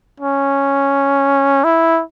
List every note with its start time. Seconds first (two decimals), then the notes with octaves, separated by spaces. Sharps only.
0.20 C#4
1.64 E4